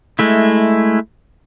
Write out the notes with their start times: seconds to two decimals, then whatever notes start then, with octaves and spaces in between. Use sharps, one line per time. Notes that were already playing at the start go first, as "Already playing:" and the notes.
0.19 G#3 A3 E4